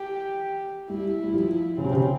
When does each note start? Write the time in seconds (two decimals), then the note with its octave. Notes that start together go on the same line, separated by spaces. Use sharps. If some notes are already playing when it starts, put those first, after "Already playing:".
Already playing: G4
0.90 G3 E4
1.24 G3
1.34 F3
1.78 C#3 C4
1.84 C3
1.93 C#3